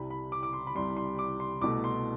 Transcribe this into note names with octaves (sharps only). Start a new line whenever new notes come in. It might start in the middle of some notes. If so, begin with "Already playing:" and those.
Already playing: C2 C3 G3 B5
B5
D6
D6
C6
B5
C2 C3 G3 C6
C6
D6
C6
C2 B2 A3 D6
C6